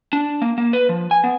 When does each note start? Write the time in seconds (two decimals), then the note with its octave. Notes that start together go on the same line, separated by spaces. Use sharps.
0.13 D4
0.42 A#3
0.58 A#3
0.73 B4
0.89 F3
1.11 G#5
1.24 B3